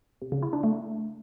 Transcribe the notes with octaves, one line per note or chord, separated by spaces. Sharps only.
C3
C#3
E4
D4
A3